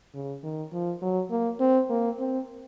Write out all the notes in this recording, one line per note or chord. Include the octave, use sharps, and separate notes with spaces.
C#3
D#3
F3
F#3
A#3
C4
A#3
C4